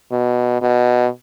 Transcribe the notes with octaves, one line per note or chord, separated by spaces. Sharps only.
B2
B2